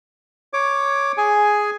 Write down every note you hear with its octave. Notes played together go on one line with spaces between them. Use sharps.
C#5 D6
G#4 G#5